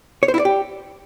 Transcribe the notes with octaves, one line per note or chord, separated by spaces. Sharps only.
C#5
C5
E4
D5
G4